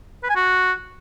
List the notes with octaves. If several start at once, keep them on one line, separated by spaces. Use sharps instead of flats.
B4
G#5
F#4